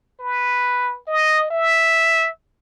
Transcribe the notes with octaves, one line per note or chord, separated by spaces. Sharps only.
B4
D#5
E5